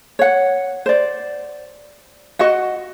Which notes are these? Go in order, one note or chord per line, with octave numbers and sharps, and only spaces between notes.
C#5 F#5
C5 D5
F#4 D#5 F#5